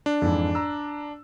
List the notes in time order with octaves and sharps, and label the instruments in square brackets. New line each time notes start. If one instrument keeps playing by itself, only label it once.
[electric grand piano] D4
[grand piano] F2 G#2 E3
A#5 E6